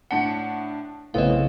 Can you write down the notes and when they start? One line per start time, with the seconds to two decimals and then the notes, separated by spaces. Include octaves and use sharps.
0.11 A2 D4 F#5 C#7
1.14 B1 A2 C#3 B3 C4 D#5 F5